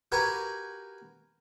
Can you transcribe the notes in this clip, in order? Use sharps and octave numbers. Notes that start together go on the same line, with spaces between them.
F#4 G4 A#4 B4 G#5 A#5